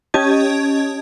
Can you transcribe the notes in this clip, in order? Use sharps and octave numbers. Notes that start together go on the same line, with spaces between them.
C#4 G4 D#5 A5 G#6